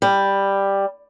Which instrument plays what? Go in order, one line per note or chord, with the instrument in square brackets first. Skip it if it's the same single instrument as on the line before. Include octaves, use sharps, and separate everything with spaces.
[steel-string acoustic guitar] G3